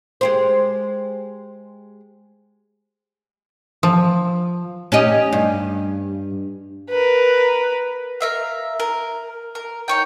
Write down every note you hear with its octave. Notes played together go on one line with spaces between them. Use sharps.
G#3 G4 C5
F3
C#4 G4 D#5
G2
A#4 B4
A#4 E5 F5
A#4
A#4
D#4 C#5 G5